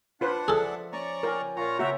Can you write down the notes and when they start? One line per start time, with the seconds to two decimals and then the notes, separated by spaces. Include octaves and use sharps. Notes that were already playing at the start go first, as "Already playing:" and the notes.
0.21 D4 F4 B4 C5 F#5
0.48 F3 G#4 A4 E5
0.93 C#4 D5 A#5 C#6
1.23 F4 A#4 G5 G#5
1.57 A#2 F4 C#5 F#5 A#5 C#6
1.79 C#3 B3 F#4 E5 G5 A#5